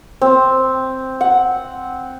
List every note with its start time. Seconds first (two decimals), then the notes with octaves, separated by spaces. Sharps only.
0.21 C4
1.21 F#5